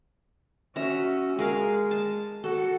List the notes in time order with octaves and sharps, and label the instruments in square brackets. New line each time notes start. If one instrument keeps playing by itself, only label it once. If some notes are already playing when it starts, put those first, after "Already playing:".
[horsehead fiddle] C#4 F#4 [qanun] E5 A#5
[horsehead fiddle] G#3 [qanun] G#4 A#4 F5
[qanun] A5
[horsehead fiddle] F#4 F#5 [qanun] A4